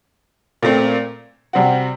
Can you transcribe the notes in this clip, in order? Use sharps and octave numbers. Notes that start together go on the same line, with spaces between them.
A#2 A3 C4
C3 G3 C4 F#4